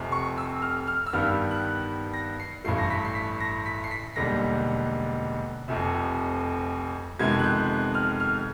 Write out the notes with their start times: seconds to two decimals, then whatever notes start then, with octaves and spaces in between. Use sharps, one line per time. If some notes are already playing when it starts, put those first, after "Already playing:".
Already playing: F1 F2 C3
0.12 C#6
0.37 E6
0.62 F6
0.87 F6
1.06 E6
1.13 G2 D#3 G3 B3 F6
1.51 F#6
2.13 A#6
2.40 C7
2.64 A1 G2 E3 A3 C7
2.78 A#6
2.90 B6
3.05 C7
3.15 B6
3.40 A#6
3.66 B6
3.84 C7
3.91 B6
4.16 E1 D#2 D3 G3 A#6
5.68 F1 F2 C3
7.19 F2 C3 D#3 G#3 B3 G#6
7.39 F#6
7.44 G6
7.70 F#6
7.95 F6
8.20 F6